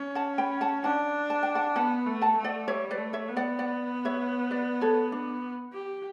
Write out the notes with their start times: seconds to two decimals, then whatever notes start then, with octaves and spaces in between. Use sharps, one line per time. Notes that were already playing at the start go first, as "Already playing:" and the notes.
Already playing: C#4
0.15 F#5 A5
0.38 G5 B5
0.61 F#5 A5
0.84 D4 F#5 A5
1.30 A5
1.43 G5
1.55 F#5 A5
1.76 B3 F#5 A5
2.06 A3
2.21 F#5 A5
2.37 A3
2.44 D5 F#5
2.68 G3 C#5 E5
2.91 B4 D5
2.98 A3
3.13 C#5 E5
3.28 B3
3.37 D5 F#5
3.59 D5 F#5
4.05 C#5 E5
4.51 B4 D5
4.81 A4 C#5
5.12 D4
5.73 G4